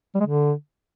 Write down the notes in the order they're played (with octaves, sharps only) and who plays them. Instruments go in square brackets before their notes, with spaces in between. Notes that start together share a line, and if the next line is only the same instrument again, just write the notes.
[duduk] G3
G#3
D3